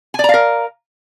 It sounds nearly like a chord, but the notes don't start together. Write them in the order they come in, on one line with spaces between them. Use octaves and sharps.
G#5 D5 A#5 F5 A#4